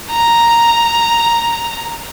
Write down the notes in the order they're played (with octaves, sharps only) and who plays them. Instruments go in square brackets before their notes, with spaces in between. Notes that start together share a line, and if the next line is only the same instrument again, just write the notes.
[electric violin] A#5